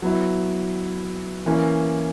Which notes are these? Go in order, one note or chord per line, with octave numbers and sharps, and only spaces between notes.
F#3 B3 E4
E3 A#3 C#4